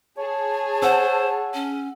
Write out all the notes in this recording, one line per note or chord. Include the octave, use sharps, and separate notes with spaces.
G#4 C#5 A5
C5 F#5 E6
C#4